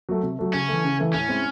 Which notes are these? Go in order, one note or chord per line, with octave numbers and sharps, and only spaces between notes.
F#3 A3
C3
F#3 A3
C#3 C#4
E3 A3
C#3
E3 A3
A2 C#4
G#3 C4 E4